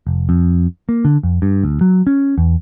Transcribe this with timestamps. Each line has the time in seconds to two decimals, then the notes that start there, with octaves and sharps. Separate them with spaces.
0.07 F1
0.29 F2
0.89 A#3
1.05 D3
1.23 F2
1.42 G2
1.64 D2
1.81 F#3
2.07 C#4
2.38 E2